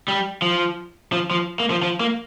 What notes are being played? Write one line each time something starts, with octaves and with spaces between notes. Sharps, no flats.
G3
F3
F3
F3
A#3
F3
F3
A#3